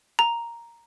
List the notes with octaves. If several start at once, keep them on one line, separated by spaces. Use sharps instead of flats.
A#5